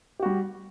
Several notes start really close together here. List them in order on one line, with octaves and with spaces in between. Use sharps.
G4 F#4 G3